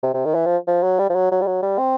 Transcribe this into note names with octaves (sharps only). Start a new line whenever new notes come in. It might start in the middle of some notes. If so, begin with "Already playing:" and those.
C3
C3
D#3
E3
F3
F3
F#3
G3
F3
F#3
F#3
G3
F#3
G3
C4